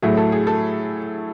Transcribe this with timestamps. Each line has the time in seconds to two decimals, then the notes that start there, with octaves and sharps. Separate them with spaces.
0.02 A2 F#3 A3 G#4
0.17 A4
0.32 G#4
0.47 A4